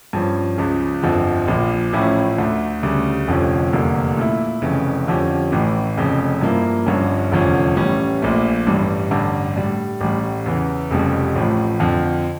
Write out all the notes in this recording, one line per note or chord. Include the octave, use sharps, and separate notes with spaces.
G2 F3 C#4
C#2 C#3 F3
G1 F2 D3 F3
A#1 A#2 F3
A1 A2 F3 C#4 E4
D2 D3 A3
D2 C#3 G3
F1 F2 D3 F3 C#4
F1 E2 D3 G3 A#3
A#2 A3 E4
F1 F2 C#3 E3
F2 D3 F3 C#4 G4
A1 A2 E3
F1 F2 C#3
G2 F3 A#3 E4
G1 G2 D3 F3 C#4
F1 E2 D3 F3 C#4
A1 A2 E3 G3 C#4
A#1 A#2 A3
A1 G2 E3 G3
A1 G2 D3
A2 G3 D4
A1 A2 G3
E2 C#3 E3
F1 F2 C#3 G3
A1 A2 F3
F2 D3 F3